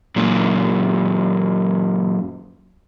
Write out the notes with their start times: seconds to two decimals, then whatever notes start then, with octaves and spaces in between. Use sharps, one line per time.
0.16 F#2 A#2